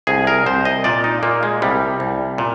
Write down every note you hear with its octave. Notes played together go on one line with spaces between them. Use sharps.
C2 G#4
A#4
C2 C5
D#5
A#2 D5
D#4
A#2 A#3
G#3
C2 G3
C2
A#2